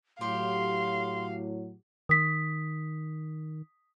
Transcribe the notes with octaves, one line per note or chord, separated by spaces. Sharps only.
A2 F#3 G4 F5 C6
D#3 D#6 B6